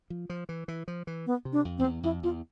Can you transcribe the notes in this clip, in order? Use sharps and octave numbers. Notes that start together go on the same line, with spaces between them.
F3
F3
E3
E3
F3
E3
B3
C3
D4
F2
F2 C4
E2
F2 E4
E2 F4